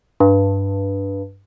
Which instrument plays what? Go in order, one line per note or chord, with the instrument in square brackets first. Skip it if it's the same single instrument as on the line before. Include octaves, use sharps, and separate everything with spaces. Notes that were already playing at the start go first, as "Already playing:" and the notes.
[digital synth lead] G2